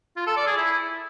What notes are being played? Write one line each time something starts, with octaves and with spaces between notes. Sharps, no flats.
F4
A4
D5
G#4
E4